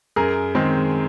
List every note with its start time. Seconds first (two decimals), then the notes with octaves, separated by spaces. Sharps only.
0.16 F#2 G#4 A#4
0.55 D#3 G#3 C4